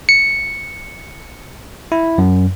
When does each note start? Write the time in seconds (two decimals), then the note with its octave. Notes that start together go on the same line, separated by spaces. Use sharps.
0.09 C#7
1.92 E4
2.18 F#2